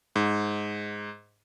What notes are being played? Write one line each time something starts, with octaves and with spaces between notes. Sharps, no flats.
G#2